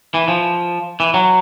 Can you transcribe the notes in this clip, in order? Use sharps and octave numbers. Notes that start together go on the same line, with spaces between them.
E3
F3
E3
F#3